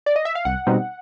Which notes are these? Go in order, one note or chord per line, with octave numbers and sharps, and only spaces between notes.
D5
D#5
E5
F5
C2 F#5
B2 G3 C4 D#4